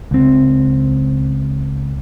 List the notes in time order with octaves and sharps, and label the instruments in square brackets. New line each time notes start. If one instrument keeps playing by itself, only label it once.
[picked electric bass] C#2 C4